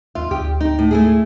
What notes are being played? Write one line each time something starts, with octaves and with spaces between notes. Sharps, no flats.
D#2 F4 E5
D2 G4
D#4
A2
A3 E4 G#4